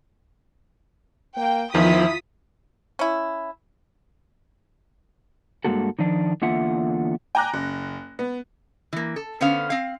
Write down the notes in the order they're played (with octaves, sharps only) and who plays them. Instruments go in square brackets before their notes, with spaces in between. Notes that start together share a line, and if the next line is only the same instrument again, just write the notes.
[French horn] A#3 [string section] G5
[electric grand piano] E2 D#3 [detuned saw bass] F3 [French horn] E4 [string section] F4 D#6 B6
[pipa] C#4 E4
[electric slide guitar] G2 C3 G#3 A#3 F#4 A4
D#3 F3 D4
E2 D3 A#3 F4 E5 F#5
[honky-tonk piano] G5 G#5 A#5 D6 F#6 A#6
F#1
B3
[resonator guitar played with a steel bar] E3 A#3
A4
D3 B3 C#4 C5 F5
C4 F5